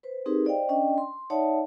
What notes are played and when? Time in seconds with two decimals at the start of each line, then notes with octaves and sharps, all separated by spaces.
0.03 B4 C5
0.26 C4 D#4 G4 G#4 A#4 B4
0.45 C5 D5 D#5 F5 G5
0.69 C#4 D4 D5 D#5 G5
0.98 C6
1.30 D#4 C#5 D5 E5 F#5 A5